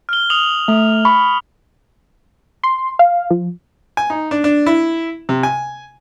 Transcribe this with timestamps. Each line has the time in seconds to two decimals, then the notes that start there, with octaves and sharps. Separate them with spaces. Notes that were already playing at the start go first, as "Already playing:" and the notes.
0.09 F6 G7
0.30 D#6 F7 F#7
0.68 A3
1.05 B5 C#6
2.64 C6
2.99 F5
3.31 F3
3.97 G#5
4.10 D#4
4.31 D4
4.44 D4
4.66 E4
5.29 C3
5.43 G#5